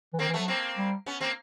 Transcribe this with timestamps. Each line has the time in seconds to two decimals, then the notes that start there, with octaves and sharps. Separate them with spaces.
0.13 E3
0.19 D#3 A#3 C4
0.29 E3
0.34 F#3 A3 B3
0.48 A#3 C4
0.77 G3
1.06 B3 C#4
1.20 A#3 C4